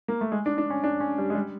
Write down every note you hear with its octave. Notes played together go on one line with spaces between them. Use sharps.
A#3
A3
G#3
D4
D4
C#4
D4
C#4
G3
G#3
G3